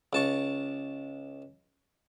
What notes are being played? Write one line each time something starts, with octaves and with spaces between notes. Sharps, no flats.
C#2 A5 C#6